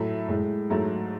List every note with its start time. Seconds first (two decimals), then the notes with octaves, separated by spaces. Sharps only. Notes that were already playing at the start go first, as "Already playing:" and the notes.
Already playing: A2 F#3 A3 E5
0.28 A2 G#3
0.70 G#2 F#3 A3